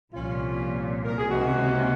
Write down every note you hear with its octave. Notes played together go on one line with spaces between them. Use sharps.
C2 A#2 F3 C#4 F4
A#4
G#4
C#2 C3 D#3 A#3 C#4 D#4 F#4